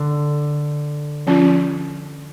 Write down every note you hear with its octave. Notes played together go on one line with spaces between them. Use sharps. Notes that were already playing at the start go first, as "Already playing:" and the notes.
Already playing: D3
F3 C#4 F4